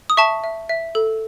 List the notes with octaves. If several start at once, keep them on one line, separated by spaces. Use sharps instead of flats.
D#6
E5 A5 C#6
E5
E5
A4